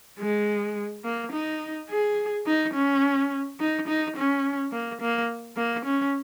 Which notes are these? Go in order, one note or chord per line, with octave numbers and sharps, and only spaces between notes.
G#3
A#3
D#4
G#4
D#4
C#4
D#4
D#4
C#4
A#3
A#3
A#3
C#4